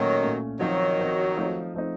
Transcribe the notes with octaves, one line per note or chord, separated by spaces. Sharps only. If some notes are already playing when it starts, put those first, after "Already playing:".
Already playing: A#2 D#3 F#3 A3 C#4
A#2 A3 C#4
D#3 F3 F#3 C4 D#4
F3 C4 D#4
F3 A3 C4 D#4
F3 A3 C4 D#4